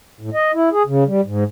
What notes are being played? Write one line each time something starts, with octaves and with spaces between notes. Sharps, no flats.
A2
D#5
E4
G#4
C#3
G3
G#2